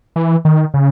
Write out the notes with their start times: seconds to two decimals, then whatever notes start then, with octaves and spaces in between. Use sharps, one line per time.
0.16 E3
0.45 D#3
0.74 C#3